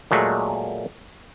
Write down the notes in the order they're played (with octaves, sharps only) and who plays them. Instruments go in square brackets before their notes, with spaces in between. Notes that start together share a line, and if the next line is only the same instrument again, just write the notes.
[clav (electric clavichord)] A#2 F#3 G#3 A3